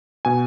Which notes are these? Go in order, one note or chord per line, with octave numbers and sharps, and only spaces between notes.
B2 G#5